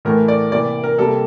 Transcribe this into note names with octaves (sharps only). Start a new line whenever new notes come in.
A2 E3 A3 A#4
D5
C3 E3 A#3 D5
A#4
C3 G3 A#3 A4